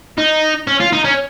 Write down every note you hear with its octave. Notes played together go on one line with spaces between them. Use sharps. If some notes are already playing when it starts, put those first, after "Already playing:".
D#4
C#4
F4
D#4
C#4